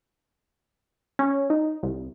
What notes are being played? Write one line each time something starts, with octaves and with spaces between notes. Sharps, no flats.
C#4
D#4
C2